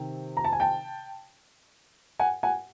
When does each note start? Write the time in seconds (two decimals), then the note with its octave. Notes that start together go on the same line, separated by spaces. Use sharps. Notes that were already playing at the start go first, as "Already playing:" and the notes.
Already playing: C3 D#3 C4
0.37 A#5
0.44 A5
0.53 G#5
0.60 G5 A5
2.20 F#5 G#5
2.43 F#5 G#5